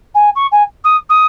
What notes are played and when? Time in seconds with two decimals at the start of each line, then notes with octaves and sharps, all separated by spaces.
0.14 G#5
0.35 C#6
0.51 G#5
0.84 D#6
1.09 D#6